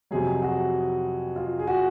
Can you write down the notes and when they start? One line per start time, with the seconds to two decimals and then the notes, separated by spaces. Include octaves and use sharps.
0.11 F2 C3 F#3 G#4
0.42 F#4
1.36 F4
1.59 G#4
1.67 F#4